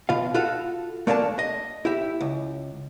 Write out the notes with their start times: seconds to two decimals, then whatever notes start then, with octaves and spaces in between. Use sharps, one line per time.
0.09 B2 F4 F5
0.34 F4 F#4 A4 F5
1.07 A3 A#3 D4 D5 A5
1.39 D#5
1.85 E4 G4 E5
2.21 C#2